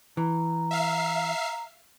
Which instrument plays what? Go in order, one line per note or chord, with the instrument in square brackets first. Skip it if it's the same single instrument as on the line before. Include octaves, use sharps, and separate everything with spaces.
[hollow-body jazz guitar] E3 [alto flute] A#5
[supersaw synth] E5 F5 C7